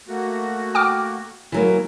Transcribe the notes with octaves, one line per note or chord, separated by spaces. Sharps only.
A3 A#3 F#4
G5 D6 F6
E3 F#3 A#3